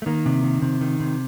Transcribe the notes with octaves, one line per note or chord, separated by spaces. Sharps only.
A3
D#3 A#3
C3
D#3
C3
D#3
C3